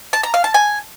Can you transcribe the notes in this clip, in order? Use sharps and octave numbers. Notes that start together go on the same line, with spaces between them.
A5
A#5
F5
A5
G#5